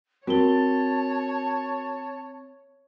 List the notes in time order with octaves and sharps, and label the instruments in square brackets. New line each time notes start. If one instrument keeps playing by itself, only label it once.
[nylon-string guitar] C4 [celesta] F#4 A#4 G7 [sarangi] C#5 [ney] A5